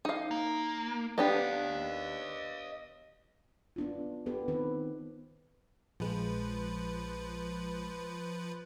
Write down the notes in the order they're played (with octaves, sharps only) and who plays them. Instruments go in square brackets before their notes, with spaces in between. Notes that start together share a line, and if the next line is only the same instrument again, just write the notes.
[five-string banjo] D#4 F5
[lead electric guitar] A#3
[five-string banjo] B3 D4 G4 [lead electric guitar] D#5 F5
[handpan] B3 D4 F4
B3 G4 A4 B4
D#3 C4 B4
[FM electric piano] A#1 G#3 [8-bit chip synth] F3 B4